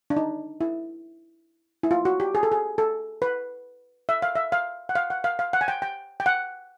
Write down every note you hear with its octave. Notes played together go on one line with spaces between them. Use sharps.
D4
D#4
E4
E4
F4
F#4
G4
G#4
A4
G#4
A4
B4
E5
F5
E5
F5
F#5
F5
F#5
F5
F5
F#5
G#5
G5
G5
G5
F#5